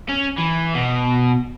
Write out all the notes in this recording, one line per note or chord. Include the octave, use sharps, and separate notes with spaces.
C#4
E3
B2